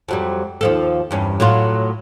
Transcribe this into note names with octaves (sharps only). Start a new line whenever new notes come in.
F2 F#3 G3
D#2 F3 A4
E2 G2 C#4
A2 F#3 F4